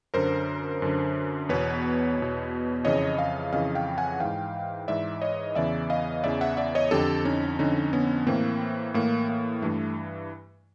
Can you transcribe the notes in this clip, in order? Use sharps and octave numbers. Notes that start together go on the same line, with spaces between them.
F#2 D3 A#4 C5
F#2 D3
E2 B2 B4 C#5
E2 B2
F2 C#3 E3 C#5 D#5
D#5 F5
F2 C#3 E3 D#5 F5
F5 G5
F#5 G#5
G#2 E3 F5 G5
G#2 E3 D5 E5
C#5 D#5
E2 C#3 E3 D5 E5
D#5 F5
E2 C#3 E3 D5 E5
E5 F#5
D5 E5
C#5 D#5
F2 D3 G4 A4
C#4 D#4
F2 D3 C#4 D#4
B3 C#4
A2 E3 A#3 C4
A2 E3 A#3
A#3
G2 E3 A3